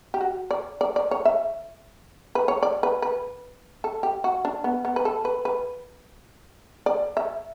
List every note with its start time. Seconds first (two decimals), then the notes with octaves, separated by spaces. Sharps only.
0.14 G4
0.21 F#4
0.51 D5
0.81 D5
0.96 D5
1.11 C#5
1.25 E5
2.35 B4
2.48 C#5
2.63 D5
2.83 B4
3.02 B4
3.84 A4
4.03 G4
4.24 F#4
4.45 D4
4.64 B3
4.85 B3
4.96 B4
5.05 A4
5.25 B4
5.45 B4
6.86 D5
7.17 E5